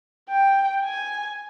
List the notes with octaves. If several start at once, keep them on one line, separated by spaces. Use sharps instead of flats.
G5
G#5